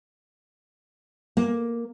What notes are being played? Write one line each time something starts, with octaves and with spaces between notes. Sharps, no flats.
A#3